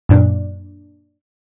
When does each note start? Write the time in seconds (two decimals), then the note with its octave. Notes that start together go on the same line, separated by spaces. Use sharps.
0.09 F#2 A#2 D4